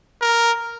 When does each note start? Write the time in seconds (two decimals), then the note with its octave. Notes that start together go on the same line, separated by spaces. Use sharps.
0.21 A#4